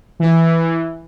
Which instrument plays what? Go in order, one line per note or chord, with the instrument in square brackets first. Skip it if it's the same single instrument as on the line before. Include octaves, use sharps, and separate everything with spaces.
[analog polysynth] E3